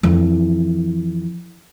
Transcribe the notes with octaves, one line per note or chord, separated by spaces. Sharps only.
F2 E3